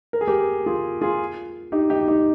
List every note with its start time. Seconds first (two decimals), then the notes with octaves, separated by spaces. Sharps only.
0.13 A#4
0.21 G#4
0.27 G4 A#4
0.66 F4 G#4
1.02 F4 G#4
1.72 D#4 G4
1.90 D#4 G4
2.08 D#4 G4